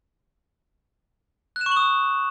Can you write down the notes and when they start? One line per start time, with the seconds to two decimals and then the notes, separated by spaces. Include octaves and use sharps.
1.56 F#6
1.61 E7
1.66 C#6
1.71 F#7
1.77 D#6